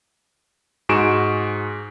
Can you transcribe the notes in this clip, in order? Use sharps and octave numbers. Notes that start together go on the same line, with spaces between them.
G#2 F#4 G#4 C#6 D7 E7